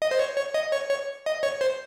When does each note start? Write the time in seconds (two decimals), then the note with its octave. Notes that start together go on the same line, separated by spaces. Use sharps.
0.02 D#5
0.11 C5
0.19 C#5
0.37 C#5
0.54 D#5
0.72 C#5
0.90 C#5
1.26 D#5
1.43 C#5
1.61 C5